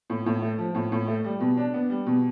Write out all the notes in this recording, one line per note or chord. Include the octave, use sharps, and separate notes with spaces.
A2
A2
A3
F3
A2
A2
A3
G3
B2
D4
B3
G3
B2